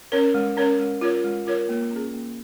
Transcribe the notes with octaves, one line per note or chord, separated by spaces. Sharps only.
C#4 A#4 C#5
G#3
C#4 A#4 C#5
G#3
F4 A#4 C#5
G#3
F4 A#4 C#5
A#3
C#4 G#4
A#3